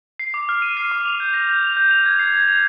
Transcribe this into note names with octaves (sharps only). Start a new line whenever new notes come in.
C7
D6
F6
D#7
C7
D6
F7
G6
A#6
G6
F7
G6
F7
G#6
C7
G#6
F7